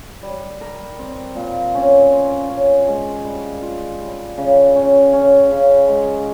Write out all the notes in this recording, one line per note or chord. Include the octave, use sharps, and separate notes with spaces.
G3
A#4
C4
A#2
C#4
F4
C#4
G#3
G3
F4
G3
C#3
C#4
C#4
C#3
G#3